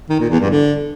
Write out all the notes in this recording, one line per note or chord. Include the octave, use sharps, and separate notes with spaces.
D#3
A#2
E2
G2
D3